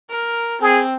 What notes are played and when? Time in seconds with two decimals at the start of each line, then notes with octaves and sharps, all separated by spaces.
0.10 A#4
0.62 C4 G#4